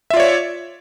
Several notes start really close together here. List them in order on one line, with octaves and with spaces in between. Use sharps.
E5 F4 D5 C#5